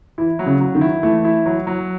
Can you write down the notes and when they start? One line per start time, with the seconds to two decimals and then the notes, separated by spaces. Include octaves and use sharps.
0.18 E3 E4
0.39 F#3
0.46 C#3
0.61 F#3
0.75 D#3
0.81 E4
1.03 E3 A3
1.25 E4
1.46 F#3
1.67 F#3